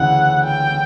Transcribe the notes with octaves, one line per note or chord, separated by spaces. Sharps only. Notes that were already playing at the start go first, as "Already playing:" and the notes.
Already playing: D2 C#3 E3 F#5
G5